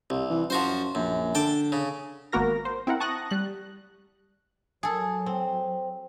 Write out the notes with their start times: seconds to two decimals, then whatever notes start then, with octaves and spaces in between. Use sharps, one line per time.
0.10 C2 C3
0.30 E3
0.50 F#2 F3 F#4 C5
0.95 A#1 F#2
1.35 D3 G5 A5 D6
1.72 C#3
2.32 G#1 A#3 B3 F#4 A#4 A#6
2.65 C5
2.87 C4 E4 A#4 F#5
3.00 A5 C#6 D#6 F#6 A#6
3.30 G3 F#6
4.83 F#3 G#4 A4
5.26 C4